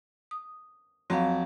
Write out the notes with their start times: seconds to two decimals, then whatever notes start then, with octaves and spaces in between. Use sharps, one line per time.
0.31 D#6
1.10 F2 F#3 C4 F5